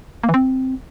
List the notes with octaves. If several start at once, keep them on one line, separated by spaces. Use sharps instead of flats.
A#3
E3
C4